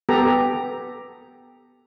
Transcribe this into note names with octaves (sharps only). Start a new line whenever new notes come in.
B3 G4 A4 A#5